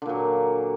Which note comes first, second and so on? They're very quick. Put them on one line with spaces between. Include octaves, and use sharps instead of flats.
D3 A#2 F#3